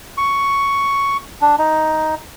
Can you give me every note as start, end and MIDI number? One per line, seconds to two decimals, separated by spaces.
0.18 1.17 85
1.41 1.55 62
1.58 2.15 63